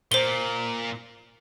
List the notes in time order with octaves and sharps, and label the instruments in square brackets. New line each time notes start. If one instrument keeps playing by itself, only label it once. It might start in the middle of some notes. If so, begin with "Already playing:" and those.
[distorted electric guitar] A#2 [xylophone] C5 G7